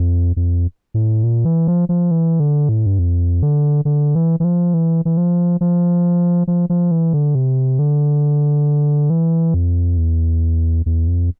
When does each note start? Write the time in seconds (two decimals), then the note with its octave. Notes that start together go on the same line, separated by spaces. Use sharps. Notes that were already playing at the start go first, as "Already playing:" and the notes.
Already playing: F2
0.36 F2
0.94 A2
1.23 A#2
1.45 E3
1.68 F3
1.89 F3
2.11 E3
2.40 D3
2.69 A2
2.86 G2
2.99 F2
3.43 D3
3.85 D3
4.15 E3
4.40 E3
4.44 F3
4.74 E3
5.05 E3
5.17 F3
5.61 F3
6.48 F3
6.70 F3
6.91 E3
7.13 D3
7.35 C3
7.79 D3
9.10 E3
9.54 F2
9.97 E2
10.86 E2
11.07 F2